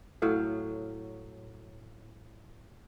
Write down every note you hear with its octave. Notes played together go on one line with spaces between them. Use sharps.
A2 F#3 F5